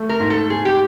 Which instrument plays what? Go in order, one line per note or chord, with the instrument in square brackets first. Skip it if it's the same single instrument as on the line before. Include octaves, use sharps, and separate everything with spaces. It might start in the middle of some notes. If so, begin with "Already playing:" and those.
Already playing: [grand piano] A3
[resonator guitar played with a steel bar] A#4
[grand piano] G#2
[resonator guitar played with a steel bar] A4
[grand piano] G#2 [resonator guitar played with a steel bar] G#4
[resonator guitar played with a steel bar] G4